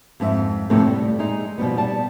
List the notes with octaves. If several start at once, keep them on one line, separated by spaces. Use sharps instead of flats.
F2 G#2 A4 E5
F2 A2 C3 A3 B3 C4
G3
G#3 D#4
B2 F3 G3 B3
G3 A5